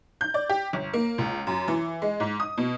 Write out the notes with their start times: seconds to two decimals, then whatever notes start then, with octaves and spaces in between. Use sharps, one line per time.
0.21 G6
0.34 D5
0.49 G4
0.73 G1
0.93 A#3
1.18 C#2
1.47 F#2
1.68 E3
2.02 G#3
2.20 G#2
2.40 D#6
2.58 B2